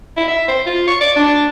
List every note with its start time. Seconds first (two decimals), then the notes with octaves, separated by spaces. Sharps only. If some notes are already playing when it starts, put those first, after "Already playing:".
0.17 E4
0.28 E5
0.48 C5
0.66 F4
0.88 C#6
1.01 D5
1.16 D4